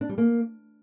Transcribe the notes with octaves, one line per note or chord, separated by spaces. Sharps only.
D4
G3
A#3